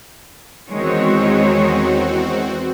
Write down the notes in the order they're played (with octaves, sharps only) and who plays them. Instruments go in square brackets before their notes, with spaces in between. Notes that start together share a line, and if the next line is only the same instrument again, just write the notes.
[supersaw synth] E2 C4 F#4 [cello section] D#3 G#3 C#5